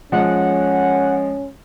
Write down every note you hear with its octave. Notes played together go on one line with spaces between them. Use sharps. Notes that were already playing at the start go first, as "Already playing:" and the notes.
F3 G#3 C#4 F#5